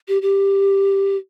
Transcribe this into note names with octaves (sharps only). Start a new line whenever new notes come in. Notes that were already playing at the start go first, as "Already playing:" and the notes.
G4
G4